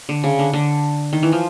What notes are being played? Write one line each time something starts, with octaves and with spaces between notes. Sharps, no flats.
D3
C#3
D3
D3
D#3
E3
F3